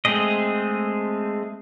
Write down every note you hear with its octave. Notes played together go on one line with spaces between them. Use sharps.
G#3 A3 C4 G#4 D#5